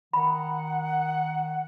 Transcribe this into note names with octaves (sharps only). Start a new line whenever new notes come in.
D#3 F#5 B5